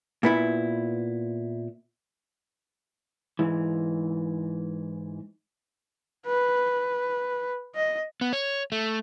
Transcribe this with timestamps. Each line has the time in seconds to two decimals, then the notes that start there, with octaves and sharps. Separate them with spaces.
0.23 A#2 B3 E4
3.39 G#2 E3
6.26 B4
7.75 D#5
8.21 B3
8.33 C#5
8.72 A3